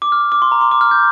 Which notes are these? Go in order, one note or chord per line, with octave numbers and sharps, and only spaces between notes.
D6
F6
D6
D6
C6
A#5
C6
D6
F6
G6